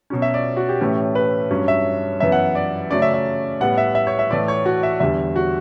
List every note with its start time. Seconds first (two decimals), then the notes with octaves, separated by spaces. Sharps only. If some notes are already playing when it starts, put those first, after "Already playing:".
0.10 B2 F#3 C#4
0.22 E5
0.34 D5
0.57 F#4
0.69 G4
0.81 A2 E3 A3 C#4
1.15 B4
1.50 G2 F#3 C#4
1.68 E5
2.20 F#2 E3 B3 E5
2.32 F#5
2.55 D5
2.91 C#3 F#3 A3 C#4 D5
3.02 E5
3.14 E5
3.60 A2 G3 B3 F#5
3.78 E5
3.95 E5
4.07 C#5
4.19 E5
4.30 A2 E3 A3 D5
4.48 C#5
4.66 F#4
4.83 E5
5.00 E2 D3 G3 E5
5.36 F#4